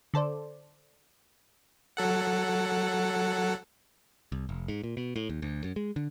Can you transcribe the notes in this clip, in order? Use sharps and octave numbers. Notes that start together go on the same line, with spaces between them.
D3 A4 C5 D5
F#3 A4 F#5
C2
F1
G#2
A#2
B2
A2
D#2
D2
F#2
G#3
D3